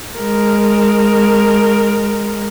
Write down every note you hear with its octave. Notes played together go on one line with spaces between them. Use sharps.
G#3 A#4